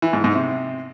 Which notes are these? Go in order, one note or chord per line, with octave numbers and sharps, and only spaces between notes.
E3
G#2
G#2
C3